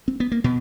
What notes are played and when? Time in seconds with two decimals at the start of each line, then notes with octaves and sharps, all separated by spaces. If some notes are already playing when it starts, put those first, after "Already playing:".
0.08 C4
0.20 B3
0.32 A#3
0.44 B2 B3